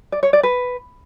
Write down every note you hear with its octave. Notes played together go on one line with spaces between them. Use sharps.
D5
C#5
D5
B4